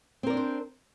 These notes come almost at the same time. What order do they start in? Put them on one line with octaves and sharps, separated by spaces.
C4 A#4 D5 D4 C5